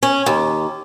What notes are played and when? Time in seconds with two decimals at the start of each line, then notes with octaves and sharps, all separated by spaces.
0.03 C#4
0.26 D#2